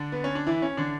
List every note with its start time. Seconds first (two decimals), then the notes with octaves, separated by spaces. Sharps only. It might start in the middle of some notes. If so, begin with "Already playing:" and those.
Already playing: D3 D4
0.12 B3
0.24 C#4
0.35 D4
0.46 E3 E4
0.62 C#4
0.77 D3 D4